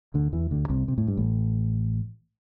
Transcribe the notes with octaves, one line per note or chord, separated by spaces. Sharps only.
D2 D3
E2 E3
D2 D3
C2 C3
C3
A2
G2
A1 A2